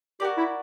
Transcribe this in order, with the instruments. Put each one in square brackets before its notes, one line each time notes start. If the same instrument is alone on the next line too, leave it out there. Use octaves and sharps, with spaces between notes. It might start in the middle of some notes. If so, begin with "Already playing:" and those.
[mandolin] F#4 A#4 D5 [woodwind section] G4
[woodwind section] E4